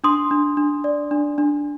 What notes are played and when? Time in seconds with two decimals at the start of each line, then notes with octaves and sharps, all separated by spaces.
0.04 D4 C6 D#6
0.31 D4
0.57 D4
0.84 D5
1.11 D4
1.38 D4